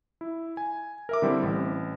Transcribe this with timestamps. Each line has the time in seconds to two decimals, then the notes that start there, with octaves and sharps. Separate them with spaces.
0.21 E4
0.57 G#5
1.09 A#4 E5 D6
1.22 D3 G3 C4 E4 C5
1.43 A1